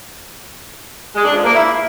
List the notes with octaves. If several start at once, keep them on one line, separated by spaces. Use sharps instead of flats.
G#3
D4
F3
A#3
E4